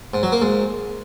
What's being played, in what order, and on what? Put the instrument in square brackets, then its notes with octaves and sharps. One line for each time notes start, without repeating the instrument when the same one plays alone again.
[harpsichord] G#2
F#3
A#3
G#2